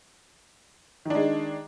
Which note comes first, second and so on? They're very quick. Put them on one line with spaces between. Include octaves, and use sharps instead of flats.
D#3 D4 G#3